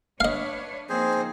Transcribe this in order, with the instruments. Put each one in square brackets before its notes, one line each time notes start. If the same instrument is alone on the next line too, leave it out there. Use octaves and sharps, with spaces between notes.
[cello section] D4 B4 C#5 [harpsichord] D#5 F5
[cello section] F3 A#3 D#4 [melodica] C4 G#4 C5